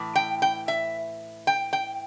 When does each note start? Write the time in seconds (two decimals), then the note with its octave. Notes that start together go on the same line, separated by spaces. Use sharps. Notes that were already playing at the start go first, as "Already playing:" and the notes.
Already playing: A2 E3
0.16 G5
0.42 G5
0.68 E5
1.47 G5
1.73 G5